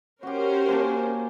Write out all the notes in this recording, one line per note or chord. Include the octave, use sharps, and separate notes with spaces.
C#4 F#4 G4 A#4 C5
A#3 G#5 A5